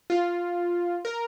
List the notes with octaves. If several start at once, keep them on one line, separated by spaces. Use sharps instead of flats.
F4
A#4